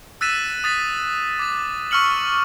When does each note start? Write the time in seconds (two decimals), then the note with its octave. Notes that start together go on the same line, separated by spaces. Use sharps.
0.21 E6 F#6 A6 B6 D#7 E7
0.64 D#6 A6 B6
1.39 D6 A6
1.91 C#6 E6 F6 C#7 F#7